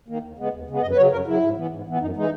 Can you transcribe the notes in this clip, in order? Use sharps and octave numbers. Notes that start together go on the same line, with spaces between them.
D#3 A#3
D#2
C#3 G#3 B3
D#2
C#3 G#3 B3
F#2 D#5
B4
C#3 F#3 C#5
F#2 A#4
C#3 F#3 E4
G#2
E3 B3
G#2
E3 B3
F#2 D#4
E3 G#3 D#4